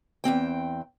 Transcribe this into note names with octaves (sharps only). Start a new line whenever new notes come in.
E2 G2 C4 G5